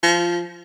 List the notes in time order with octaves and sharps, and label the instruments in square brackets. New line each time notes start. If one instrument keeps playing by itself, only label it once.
[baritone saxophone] F3